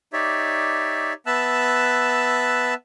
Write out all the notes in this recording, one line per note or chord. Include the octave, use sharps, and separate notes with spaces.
D#4 G4 C#5 D5 E5
B3 E5 A5 E6 F#6